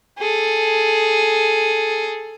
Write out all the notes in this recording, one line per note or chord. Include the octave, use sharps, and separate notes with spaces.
G#4 A4